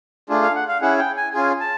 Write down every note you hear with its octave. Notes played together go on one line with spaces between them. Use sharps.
A3 D4 F4 G#4
F5
F#5
F5
C#4 E4 G#4 F#5
G5
G#5
C#4 F4 G#4 G#5
A5